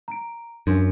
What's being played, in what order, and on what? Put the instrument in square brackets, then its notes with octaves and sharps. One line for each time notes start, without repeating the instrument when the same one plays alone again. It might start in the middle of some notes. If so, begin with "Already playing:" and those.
[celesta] A#5 D7
[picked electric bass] F#2 [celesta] D4 C6